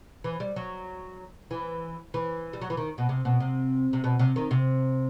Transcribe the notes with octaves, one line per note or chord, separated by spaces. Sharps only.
E3
G3
F#3
E3
E3
G3
F#3
E3
D#3
B2
C3
B2
C3
C3
B2
C3
D#3
C3